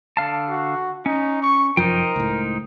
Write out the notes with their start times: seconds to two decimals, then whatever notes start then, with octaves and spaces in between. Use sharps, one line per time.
0.17 D3 F5 A5
0.49 F#4
1.06 C#4 D#4
1.42 C#6
1.77 F1 F#2 F3 D#4 A#4 C5 G5
2.16 C#2 A2